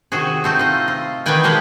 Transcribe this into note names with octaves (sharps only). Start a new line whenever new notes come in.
C3 D#3 F#4 G#4
A3 C4 D#4
F4 D#5
F4
B2 D#3 E3 B4 G5 G#5
F3 G#3 A#3 G4 B4